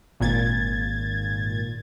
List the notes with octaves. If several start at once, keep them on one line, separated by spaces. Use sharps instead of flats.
G#1 A#2 G#6 A6